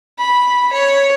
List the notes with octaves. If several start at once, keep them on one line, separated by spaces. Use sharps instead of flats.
B5
C#5